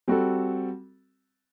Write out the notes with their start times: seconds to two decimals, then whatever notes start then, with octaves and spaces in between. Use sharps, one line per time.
0.08 G3 C4 F#4 A4